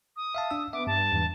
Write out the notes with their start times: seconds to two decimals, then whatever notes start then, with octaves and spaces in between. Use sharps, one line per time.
0.16 D#6
0.35 E5 F5 A5
0.51 D4 E6
0.73 B3 E5 D6
0.87 G2 A5
1.12 E2 G#2 E3